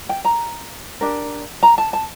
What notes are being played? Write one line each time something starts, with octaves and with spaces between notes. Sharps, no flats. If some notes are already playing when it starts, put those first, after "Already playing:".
G5
A#5
D4 G4 A#4
A#5
A5
A5